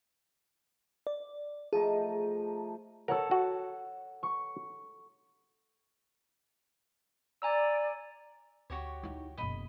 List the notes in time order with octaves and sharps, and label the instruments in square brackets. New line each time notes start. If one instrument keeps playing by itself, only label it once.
[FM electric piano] D5
[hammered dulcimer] F3 A3 D#4 [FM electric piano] G#4
[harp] A4 C#5 F#5 [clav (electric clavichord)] A#4
[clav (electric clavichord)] F#4
[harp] C#6
[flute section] D5 [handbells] G#5 A#5 E6
[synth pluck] D2 [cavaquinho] F#4 G4 C#5
[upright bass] D#4 E4
[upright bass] F#1 B2 [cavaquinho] D#5 B5